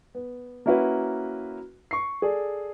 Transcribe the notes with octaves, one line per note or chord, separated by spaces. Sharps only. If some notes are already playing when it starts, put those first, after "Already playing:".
B3
A#3 C#4 E4 F#4 A#4 B4
C#6 C7
G#4 A4 D5